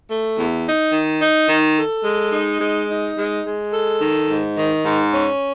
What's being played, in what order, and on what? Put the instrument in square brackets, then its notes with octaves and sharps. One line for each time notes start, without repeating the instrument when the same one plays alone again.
[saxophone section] A3
E2
D#4
D#3
D#4
D#3
A4
G#3
D#4
G#3
D#4
G#3
G#3
A4
D#3
G#2
D#3
G#2
C#4